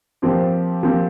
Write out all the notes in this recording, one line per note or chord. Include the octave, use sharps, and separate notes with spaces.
A#2 F3 C4 G4
A#2 F3 C4 G4